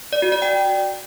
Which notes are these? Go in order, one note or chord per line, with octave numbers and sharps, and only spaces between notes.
D5
F#4
D5
G5